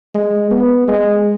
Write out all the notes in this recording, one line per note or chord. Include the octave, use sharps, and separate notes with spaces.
G#3
B3
G#3